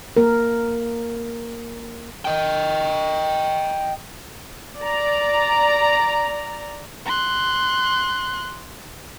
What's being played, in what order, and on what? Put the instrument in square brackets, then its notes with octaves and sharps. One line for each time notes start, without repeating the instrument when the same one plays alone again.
[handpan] A#3 A#4
[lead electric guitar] D#5 G5
[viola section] D5 A#5
[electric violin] C6 F#6